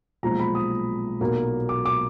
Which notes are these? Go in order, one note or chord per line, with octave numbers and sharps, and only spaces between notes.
B1 A#2 F3 G#3 A#5
B5
D#6
B1 A#2 F#3 A#3
D6
D6